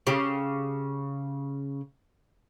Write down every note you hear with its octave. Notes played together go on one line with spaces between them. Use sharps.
C#3 G4